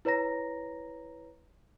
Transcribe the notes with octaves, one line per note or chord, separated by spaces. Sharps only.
E4 B4 C#5 A#5 A#6